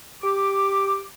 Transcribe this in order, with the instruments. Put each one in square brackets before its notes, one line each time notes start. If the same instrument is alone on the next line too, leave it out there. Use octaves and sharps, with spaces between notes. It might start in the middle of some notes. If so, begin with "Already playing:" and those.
[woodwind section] G4 D6